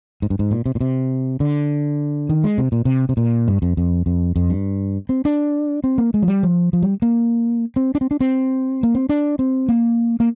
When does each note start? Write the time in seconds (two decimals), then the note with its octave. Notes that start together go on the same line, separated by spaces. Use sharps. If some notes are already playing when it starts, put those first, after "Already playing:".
0.22 G#2
0.30 G2
0.39 G#2
0.51 A#2
0.66 C3
0.75 A#2
0.81 C3
1.40 D3
2.29 D#3
2.44 G#3
2.58 C3
2.72 A#2
2.85 C3
3.09 C3
3.17 A#2
3.48 G2
3.62 F2
3.77 F2
4.06 F2
4.36 F2
4.50 G2
5.09 C4
5.25 D4
5.84 C4
5.98 A#3
6.14 G#3
6.23 F3
6.28 G3
6.43 F3
6.73 F3
6.83 G3
7.02 A#3
7.76 C4
7.95 D4
8.01 C4
8.11 D4
8.21 C4
8.83 A#3
8.95 C4
9.09 D4
9.39 C4
9.69 A#3
10.20 A#3